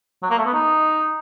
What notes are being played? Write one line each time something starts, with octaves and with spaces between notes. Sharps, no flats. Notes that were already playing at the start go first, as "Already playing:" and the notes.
F#3
A#3
A3
B3
D#4